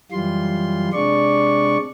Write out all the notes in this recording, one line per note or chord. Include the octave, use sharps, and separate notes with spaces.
F#2 E3 G3 F4 C6
C3 G#3 D4 D5 C#6